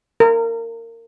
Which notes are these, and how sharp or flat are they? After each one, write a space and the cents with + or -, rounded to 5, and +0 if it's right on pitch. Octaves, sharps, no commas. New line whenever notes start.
A#4 -25